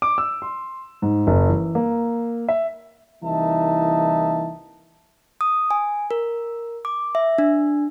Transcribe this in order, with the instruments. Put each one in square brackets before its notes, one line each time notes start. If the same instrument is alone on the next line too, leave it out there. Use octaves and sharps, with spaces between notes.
[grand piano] D6
E6
C6
G#2
F#1
E3
A#3
E5
[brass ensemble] C2 E3 A#3 D#4 E5 A5
[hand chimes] D#6
G#5
A#4
D6
E5
D4